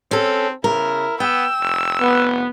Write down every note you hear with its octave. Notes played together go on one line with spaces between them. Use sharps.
C4 C#4 A4
C#3 E4 A#4
B3 G5 E6
F1
B3